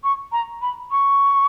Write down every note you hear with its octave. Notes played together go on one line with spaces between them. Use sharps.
C#6
A#5
B5
C#6